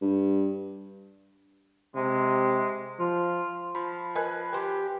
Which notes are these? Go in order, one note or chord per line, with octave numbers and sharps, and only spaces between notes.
G2
C3 G#3
F3 F4
F3 B5
A#4 B4 D#5 G#5 B5 F#6
G4 B4 C6